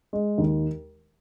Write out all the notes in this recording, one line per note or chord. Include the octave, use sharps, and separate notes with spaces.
G#3
D#2